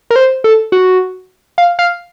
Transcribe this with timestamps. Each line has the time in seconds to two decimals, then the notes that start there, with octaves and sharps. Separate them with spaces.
0.11 A#4
0.16 C5
0.44 A4
0.72 F#4
1.58 F5
1.79 F5